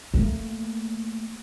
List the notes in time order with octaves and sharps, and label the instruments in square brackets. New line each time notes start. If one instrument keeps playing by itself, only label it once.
[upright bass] A3 A#3